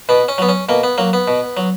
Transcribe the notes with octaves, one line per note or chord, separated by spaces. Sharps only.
B2 B3
C#4
F#3 B3
C#4
B2 A#3
B3
F#3 A#3
B3
B2
F#3